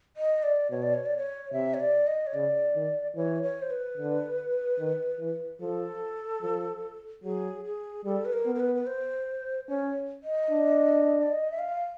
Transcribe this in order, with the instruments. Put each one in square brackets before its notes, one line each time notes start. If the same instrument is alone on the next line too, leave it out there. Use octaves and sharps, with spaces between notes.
[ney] D#5
D5
[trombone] B2 [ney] C#5
[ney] D5
C#5
D5
C#5
[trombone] C3 [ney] E5
[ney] C#5
D5
D#5
C#5
[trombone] C#3 [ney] D5
[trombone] D#3
[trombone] E3 [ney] C#5
[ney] C#5
C5
B4
[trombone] D3
D#3
E3
[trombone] F3 [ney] A4
[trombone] F3
[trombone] F#3 [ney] G#4
[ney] G#4
[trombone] G3 [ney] A4
[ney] B4
A#4
[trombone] B3
[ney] A#4
B4
B4
C5
[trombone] C#4 [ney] C#5
[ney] D#5
[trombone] D4
[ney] D5
D#5
E5
F5